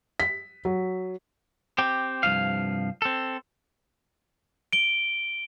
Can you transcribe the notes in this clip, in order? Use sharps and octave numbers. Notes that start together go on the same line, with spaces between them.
B6
F#3
C4 G4
C2 G2 F3 F5
C4 A4
D7 G7